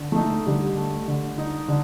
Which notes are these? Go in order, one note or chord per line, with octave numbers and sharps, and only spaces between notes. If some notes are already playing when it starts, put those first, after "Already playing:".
Already playing: D3
A3 D#4
D3 G3
A3
D3
D#4
D3